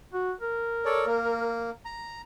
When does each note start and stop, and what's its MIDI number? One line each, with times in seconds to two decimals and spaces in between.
0.13 0.32 66
0.41 1.61 70
0.86 1.06 69
0.86 1.06 73
0.86 1.06 74
1.06 1.70 58
1.85 2.21 82